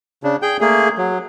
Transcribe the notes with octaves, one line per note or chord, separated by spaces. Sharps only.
C#3 D4
G#4 G5 G6
A3 A#3 G#4
F#3